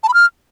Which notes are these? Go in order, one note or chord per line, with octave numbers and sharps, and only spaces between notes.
A5
B5
F6